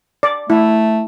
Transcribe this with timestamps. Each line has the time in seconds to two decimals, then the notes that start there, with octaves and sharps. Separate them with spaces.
0.23 D5
0.50 A3 E4